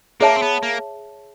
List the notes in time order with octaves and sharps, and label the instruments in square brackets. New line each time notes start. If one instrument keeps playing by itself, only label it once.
[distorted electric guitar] A#3 [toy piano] G#4 C#5 E5 A5
[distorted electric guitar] C4
B3
A#3